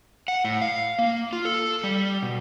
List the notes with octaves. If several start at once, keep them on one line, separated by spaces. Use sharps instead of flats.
F#5
A2
F5
A#3
F4
A4
G3
B2